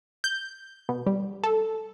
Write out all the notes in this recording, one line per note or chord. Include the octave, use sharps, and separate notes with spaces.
G6
B2
G3
A4